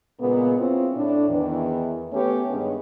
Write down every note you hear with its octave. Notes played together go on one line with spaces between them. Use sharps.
A#2 C#3 G#3 A#3 B3
C4 C#4 E4 F4
A2 D4
E2 D#3 E3
A3 B3 C#4 G4 B4 C#5
G2 D#3 G#3 B3 C#4